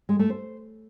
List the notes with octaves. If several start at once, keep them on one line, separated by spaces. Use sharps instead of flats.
G#3
A3
C5